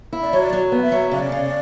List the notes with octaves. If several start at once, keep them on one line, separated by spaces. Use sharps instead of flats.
E4
D5
F#3 C#5
D5
F#3
B3
F#5
E5
F#3
C#3 D5
C#3